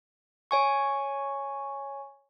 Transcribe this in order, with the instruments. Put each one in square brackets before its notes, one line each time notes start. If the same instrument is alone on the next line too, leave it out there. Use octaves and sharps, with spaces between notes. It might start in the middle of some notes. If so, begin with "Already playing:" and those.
[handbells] C#5 G#5 C#6